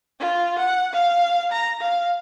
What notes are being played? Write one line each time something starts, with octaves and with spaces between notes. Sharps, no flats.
F4
F#5
F5
A#5
F5